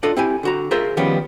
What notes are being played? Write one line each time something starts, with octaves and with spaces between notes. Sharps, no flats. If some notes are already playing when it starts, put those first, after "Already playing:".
D4 F4 A4 D5 D#5
C4 E4 G4 G#5
D3 F#4 A#5
F4 G#4 A#4 C5 E5
D#3 F3 G3 B3 C#4